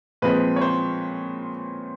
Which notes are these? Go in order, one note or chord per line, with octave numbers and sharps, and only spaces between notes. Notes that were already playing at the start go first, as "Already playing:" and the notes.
A#2 F3 G#3 C4 B4
C#5
C5